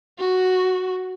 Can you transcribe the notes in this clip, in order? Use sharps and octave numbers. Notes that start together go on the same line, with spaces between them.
F#4